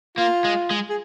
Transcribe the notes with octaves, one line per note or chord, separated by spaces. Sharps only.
A#3 F4
G#3
G#3
G#4